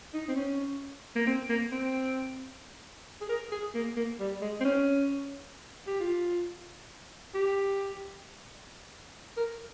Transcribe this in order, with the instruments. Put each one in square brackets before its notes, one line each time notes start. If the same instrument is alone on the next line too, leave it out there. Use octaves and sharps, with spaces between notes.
[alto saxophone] D#4
C4
C#4
A#3
C4
A#3
C4
G#4
A#4
G#4
A#3
A#3
G3
G#3
C4
C#4
G4
F4
G4
A#4